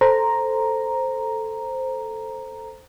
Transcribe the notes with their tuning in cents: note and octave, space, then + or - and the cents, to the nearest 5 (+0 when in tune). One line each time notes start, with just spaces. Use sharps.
A4 +0 C5 +0 A#5 +0